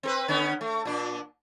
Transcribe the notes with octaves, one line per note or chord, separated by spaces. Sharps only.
C4 A#4 B4
D3 B3 C#4
A3
A#2 D4